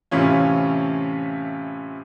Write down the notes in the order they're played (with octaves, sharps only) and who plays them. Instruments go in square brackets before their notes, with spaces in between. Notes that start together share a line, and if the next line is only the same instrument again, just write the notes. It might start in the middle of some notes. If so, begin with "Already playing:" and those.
[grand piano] A2 C3 E3 C#4 F4